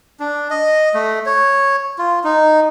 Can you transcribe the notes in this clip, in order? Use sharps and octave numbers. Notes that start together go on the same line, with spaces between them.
D4
D#5
A3
C#5
F4
D#4